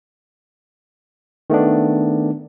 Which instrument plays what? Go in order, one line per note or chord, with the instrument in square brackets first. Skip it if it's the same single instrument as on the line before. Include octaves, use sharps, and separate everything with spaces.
[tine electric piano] D#3 A3 B3 D4